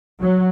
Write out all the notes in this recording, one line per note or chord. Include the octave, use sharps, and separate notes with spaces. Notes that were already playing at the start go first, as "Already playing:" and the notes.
F#3